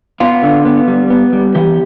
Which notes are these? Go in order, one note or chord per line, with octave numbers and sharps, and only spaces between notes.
B3 F4
D3
B3
G3
B3
G3
E3 G4